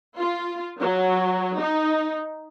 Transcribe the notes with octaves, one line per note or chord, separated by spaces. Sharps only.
F4
F#3
D#4